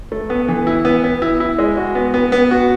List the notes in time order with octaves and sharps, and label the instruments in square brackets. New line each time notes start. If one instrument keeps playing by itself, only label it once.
[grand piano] A3
B3
E3
E4
B3
B3
E4
E4
G#3
F#4
B3
B3
B3
F#4